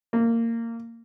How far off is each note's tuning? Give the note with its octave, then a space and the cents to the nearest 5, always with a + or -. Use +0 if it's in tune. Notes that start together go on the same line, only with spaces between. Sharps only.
A#3 -20